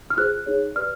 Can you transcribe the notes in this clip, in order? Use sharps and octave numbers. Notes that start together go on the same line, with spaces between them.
F6
F4 G#4 C5 F#6
D#4 G#4 C#5
G4 B4 D5 F6